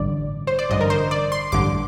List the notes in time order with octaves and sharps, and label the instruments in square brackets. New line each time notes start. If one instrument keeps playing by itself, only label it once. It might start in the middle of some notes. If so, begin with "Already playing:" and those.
Already playing: [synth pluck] A1 G2 D3 D5
C5
D5
A1 G2 D3 D#5
A#4
C5
D5
C6
A1 G2 D3 D6